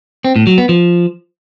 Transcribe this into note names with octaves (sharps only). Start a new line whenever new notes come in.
C4
A2
F#3
B3
F3